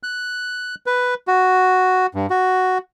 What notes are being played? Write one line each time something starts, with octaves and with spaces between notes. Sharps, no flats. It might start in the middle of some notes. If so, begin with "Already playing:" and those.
F#6
B4
F#4
G2
F#4